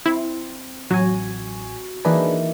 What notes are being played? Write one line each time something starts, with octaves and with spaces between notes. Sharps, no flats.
C4 E4
A1 F#3 F#4 G#5
E3 A#3 D4 D#4 G#4 B4